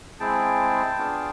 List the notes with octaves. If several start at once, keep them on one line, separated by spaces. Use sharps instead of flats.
G#3 C4 E4 G#4 G5 A5
B3 D4 F4 G#4